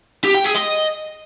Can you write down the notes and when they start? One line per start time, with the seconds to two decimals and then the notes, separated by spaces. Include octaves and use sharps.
0.24 G4
0.35 G5
0.45 G#4
0.56 D#5